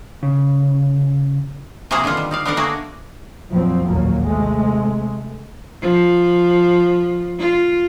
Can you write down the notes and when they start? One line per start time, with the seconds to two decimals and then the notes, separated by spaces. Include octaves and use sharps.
0.23 C#3
1.91 C3 F3 A#3 F#4 G#4 A#5
2.04 D3 D#3 B3 F4 F#5
2.17 G3
2.31 D#4 D5 F5
2.45 D3 B3 A#4 D5 F5 F#5
2.57 A3 A#3 D4 F#4 G#4 A#4
3.50 F2 A#2 F3 F#3 C4
3.87 A1 D#2 A#2 F#3 A#3
4.25 C3 G#3 A3
5.82 F3
7.39 F4